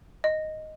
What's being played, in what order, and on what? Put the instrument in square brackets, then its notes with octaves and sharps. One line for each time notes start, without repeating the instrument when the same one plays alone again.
[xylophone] D#5